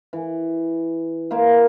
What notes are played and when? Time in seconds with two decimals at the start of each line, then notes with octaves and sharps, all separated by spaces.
0.13 E3
1.31 A#3 E4 C5 F5